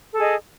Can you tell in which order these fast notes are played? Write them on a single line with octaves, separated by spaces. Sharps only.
A4 G#4 D#5